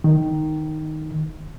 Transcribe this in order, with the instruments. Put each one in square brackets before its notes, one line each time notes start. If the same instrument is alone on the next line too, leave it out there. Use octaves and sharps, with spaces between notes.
[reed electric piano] D#3